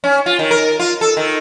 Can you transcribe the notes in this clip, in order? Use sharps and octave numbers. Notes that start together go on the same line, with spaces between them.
C#4
F4
D#3
A#4
F4
A4
D#3